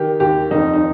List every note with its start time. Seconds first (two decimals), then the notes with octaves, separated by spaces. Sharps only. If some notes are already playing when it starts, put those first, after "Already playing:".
Already playing: D#3 G4
0.20 D#2 G4
0.51 F2 D#4
0.73 D#4